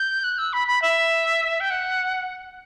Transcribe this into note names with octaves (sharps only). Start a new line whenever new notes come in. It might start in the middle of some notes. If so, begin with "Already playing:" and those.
Already playing: G6
F#6
E6
B5
B5
E5
G5
F#5